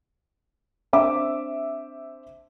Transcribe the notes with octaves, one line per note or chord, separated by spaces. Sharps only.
C4 D4 E5 D6